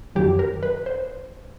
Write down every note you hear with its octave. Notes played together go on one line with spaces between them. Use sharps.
F#2 D#3 F#3 G4
A#4
B4
C5